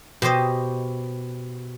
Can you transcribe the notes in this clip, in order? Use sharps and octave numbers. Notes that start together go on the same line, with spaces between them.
B2 G4 C5 D#5